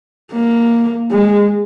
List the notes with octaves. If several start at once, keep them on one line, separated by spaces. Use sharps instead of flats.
A#3
G#3